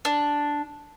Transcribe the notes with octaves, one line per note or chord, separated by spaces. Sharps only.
D4